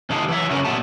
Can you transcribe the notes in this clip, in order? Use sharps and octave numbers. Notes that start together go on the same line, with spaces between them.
C3 D#3 D#4 G#4 F5 A5
E3 F#3 E5
C#3 F#3 C#4 A#4
A#2 F#3 B3 E5 A5